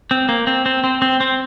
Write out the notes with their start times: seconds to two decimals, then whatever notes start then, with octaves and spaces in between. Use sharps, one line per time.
0.11 C4
0.29 A#3
0.47 C4
0.66 C4
0.84 C4
1.02 C4
1.20 C4